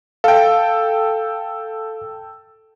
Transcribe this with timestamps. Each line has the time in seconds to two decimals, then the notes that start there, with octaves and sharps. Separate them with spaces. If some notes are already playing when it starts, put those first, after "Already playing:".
0.24 A4 F5 G5